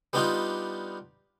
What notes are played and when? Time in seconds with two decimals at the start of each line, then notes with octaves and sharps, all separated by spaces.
0.13 G3 B3 D4 D#4 F4 G4